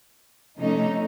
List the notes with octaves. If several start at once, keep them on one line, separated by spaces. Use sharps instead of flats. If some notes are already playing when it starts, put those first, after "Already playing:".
C3 F3 A3 C#4 D#4